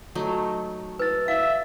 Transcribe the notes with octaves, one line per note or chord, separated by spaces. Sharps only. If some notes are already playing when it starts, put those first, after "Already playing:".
F#3 A3 D#4
B4 E6 A6
E5 F5